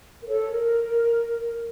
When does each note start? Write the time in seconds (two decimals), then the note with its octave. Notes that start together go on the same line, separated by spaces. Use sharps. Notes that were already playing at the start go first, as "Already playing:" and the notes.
0.21 A#4
0.27 A4 C#5
0.50 A#4